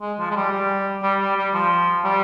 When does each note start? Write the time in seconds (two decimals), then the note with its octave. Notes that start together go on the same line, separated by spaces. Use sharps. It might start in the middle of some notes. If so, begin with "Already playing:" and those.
0.01 G#3
0.19 F3
0.31 G#3
0.36 G3
0.52 G3
1.02 G3
1.20 G3
1.37 G3
1.53 F3
2.04 G3